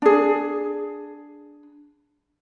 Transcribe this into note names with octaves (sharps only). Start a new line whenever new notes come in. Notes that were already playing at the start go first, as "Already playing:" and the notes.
D4 G#4